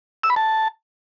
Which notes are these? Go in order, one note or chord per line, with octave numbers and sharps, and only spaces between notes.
E6
B5
A5